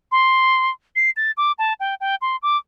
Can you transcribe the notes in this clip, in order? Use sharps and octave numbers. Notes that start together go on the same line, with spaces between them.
C6
C7
A6
D6
A5
G5
G5
C6
D6